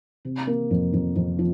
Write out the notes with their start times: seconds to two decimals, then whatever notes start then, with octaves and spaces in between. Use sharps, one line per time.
0.25 C3
0.47 A#3
0.71 F2
0.93 F2
1.16 F2
1.39 F3